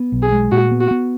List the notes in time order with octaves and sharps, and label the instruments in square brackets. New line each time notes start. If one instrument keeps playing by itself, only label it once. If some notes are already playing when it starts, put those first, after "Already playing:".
Already playing: [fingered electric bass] B3
B1
[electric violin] G#4
[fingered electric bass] G#3
[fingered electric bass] A#2 [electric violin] F#4
[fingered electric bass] B3
[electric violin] F#4
[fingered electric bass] B3